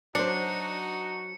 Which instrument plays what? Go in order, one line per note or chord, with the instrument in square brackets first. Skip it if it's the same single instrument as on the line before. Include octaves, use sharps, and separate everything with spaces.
[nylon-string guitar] F#3 C5 [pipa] D4 [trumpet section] D#4 F#4 [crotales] C#7